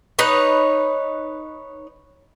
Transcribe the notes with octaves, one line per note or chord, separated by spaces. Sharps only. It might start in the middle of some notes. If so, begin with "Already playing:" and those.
D#4 B4 C#5